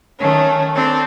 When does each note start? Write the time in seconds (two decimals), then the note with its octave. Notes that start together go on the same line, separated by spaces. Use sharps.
0.18 D#3 A3 C#4
0.75 C4 D4 A4